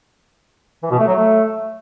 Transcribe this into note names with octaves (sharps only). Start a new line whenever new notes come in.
E3
B2
A3
F#3
A3